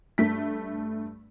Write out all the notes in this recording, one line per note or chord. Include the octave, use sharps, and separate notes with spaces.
G2 A3 B6